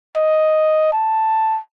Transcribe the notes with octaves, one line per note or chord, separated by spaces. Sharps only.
D#5
A5